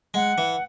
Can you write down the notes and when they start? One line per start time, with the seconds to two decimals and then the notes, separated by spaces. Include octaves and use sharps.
0.14 G#3 F#5
0.38 E3